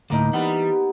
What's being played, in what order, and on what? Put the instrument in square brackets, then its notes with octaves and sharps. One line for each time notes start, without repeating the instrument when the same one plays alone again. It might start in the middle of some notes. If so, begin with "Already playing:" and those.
[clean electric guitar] D2 A2 [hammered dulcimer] A#3 D#4
[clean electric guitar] E3 [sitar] G3 [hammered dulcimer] B3